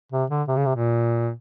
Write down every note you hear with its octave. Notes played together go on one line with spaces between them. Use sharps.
C3
D3
C3
C#3
C3
A#2